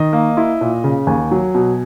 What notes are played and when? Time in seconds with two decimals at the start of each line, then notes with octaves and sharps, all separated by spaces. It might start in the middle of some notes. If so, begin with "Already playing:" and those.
Already playing: D#3 D#5
0.13 A#3
0.37 E4
0.61 A#2
0.84 C#3
1.07 D#2 G#5
1.31 F#3
1.55 B2